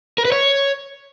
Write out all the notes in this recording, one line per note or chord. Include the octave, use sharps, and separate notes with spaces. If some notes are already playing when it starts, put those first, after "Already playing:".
A#4
B4
C#5